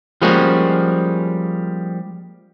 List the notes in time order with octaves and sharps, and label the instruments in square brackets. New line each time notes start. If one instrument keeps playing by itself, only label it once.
[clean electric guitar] F3 G3 G#3 A#3 C#4 F#4